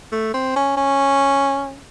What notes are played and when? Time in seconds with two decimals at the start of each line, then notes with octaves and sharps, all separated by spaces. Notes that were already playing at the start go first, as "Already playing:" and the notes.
0.12 A3
0.34 C4
0.56 C#4
0.77 C#4